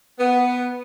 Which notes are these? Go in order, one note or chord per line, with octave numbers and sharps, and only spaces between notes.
B3